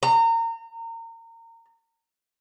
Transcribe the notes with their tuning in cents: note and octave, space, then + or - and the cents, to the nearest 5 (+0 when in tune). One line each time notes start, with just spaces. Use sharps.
A#5 -30